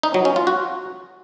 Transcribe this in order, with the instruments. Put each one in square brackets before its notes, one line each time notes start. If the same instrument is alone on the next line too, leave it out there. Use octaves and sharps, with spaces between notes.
[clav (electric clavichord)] D#4
F#3
C#4
F4
F#4